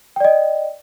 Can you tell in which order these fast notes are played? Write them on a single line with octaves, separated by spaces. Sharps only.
G5 D5 D#5